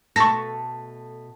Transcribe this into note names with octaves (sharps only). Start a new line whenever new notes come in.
B2 A3 A4 C#6 A#6